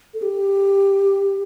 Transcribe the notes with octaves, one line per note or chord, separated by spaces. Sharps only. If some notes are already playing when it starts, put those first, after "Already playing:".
A4
G4